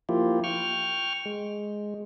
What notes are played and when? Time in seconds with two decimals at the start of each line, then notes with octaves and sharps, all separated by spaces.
0.09 F3 A#3 E4 F4 G4
0.44 G5 C#6 F6
1.26 G#3